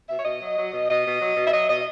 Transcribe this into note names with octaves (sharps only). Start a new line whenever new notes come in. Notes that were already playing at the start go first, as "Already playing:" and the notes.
B2 E5
C#5
B2 D#5
F#3
F#3
B2
B2 D#5
B2
F#3
B2
E5
F#3 D#5
B2 D#5